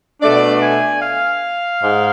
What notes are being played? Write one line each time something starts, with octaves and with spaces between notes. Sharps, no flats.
B2 A3 D4 D5
G#5
F5
G#2